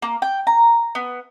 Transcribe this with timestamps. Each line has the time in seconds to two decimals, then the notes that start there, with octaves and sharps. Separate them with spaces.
0.02 A#3
0.22 G5
0.47 A#5
0.95 B3